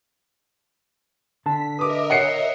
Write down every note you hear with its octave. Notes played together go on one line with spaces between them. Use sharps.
D3 A5 B6
A#4 B4 D#5 E5 D6 D#6
C#5 F#5 C7 C#7